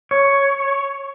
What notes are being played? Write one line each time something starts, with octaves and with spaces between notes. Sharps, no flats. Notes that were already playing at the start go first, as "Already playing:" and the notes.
C#5